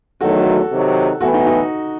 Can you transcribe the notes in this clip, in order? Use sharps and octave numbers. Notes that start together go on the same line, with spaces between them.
E2 D#3 F#3 A3 F#4 A4
C3 D#3 F#3
A2 E3 B3 F#4 A4
D#4 F#4
D#4 F#4